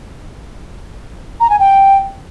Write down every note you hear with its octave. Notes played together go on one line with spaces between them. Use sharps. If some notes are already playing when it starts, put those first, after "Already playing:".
A#5
G#5
G5